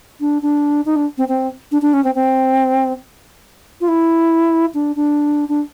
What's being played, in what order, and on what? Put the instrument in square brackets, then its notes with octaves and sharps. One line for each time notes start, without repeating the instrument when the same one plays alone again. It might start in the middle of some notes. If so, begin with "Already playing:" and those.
[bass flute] D4
D4
D#4
D4
C4
C4
D4
D4
C#4
C4
C4
F4
E4
D4
D4
D4